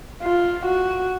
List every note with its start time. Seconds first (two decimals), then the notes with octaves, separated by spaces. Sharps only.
0.23 F4
0.66 F#4